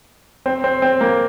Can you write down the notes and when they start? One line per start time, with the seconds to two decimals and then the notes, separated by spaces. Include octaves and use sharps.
0.46 C4
0.64 C4
0.82 C4
1.01 A#3